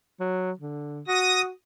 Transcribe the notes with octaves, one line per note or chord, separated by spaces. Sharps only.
F#3
D3
F#4 D#6 A#6